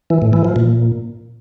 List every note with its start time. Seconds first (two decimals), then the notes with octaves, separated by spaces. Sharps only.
0.10 E3
0.22 A2
0.33 E3
0.45 F3
0.56 A#2